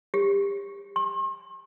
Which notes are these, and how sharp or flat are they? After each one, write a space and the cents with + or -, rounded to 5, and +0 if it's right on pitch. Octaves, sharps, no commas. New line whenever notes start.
G4 +25
C6 +45